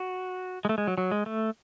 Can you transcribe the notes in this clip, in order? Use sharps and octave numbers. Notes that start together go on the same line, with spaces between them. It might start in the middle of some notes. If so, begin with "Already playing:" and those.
Already playing: F#4
G#3
A3
G#3
F#3
F#3
G#3
A3